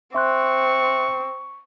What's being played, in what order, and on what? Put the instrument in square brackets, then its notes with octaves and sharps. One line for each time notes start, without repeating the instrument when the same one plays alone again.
[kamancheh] C4 [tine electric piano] E5 C6 F#6 [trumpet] C#6